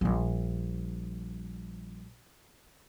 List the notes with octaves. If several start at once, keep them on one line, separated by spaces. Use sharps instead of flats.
A#1 G3